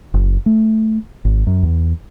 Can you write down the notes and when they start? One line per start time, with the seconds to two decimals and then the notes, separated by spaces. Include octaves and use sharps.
0.14 F#1
0.46 A3
1.25 G#1
1.47 F#2
1.63 E2